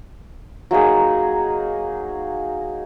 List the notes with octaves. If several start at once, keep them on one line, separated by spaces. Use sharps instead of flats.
F#3 A#3 D#4 G#4